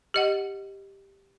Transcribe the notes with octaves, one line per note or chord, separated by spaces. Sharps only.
G4 D#5 F#5